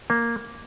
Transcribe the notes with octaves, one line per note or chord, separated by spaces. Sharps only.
A#3